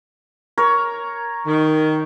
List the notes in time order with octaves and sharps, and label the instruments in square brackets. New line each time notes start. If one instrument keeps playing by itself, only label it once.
[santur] A#4 C#5
[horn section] D#3